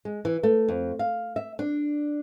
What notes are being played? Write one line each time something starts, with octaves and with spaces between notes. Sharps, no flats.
G#3
E3
A3
F2
F5
E5
D4